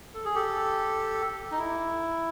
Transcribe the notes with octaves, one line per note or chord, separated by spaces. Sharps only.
A4
G#4
G4 A4
D#4
E4